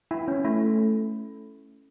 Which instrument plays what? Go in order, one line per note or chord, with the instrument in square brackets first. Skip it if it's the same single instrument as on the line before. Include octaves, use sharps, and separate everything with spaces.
[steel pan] E4
C#4
[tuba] A3 [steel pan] E4